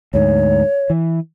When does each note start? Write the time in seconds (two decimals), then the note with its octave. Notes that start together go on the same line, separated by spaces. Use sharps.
0.14 D2 G#2 C#5
0.90 E3